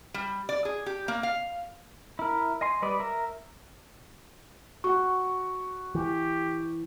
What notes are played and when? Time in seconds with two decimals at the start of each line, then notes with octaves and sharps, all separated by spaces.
0.14 G3
0.49 D5
0.65 G#4
0.86 G4
1.08 A#3
1.23 F5
2.19 E4 A#4
2.61 D#5 G#5 C6
2.82 G3 B4 D5 D#5
3.00 A#4 E5
4.84 F#4 F#5 C#6
5.95 E3 G4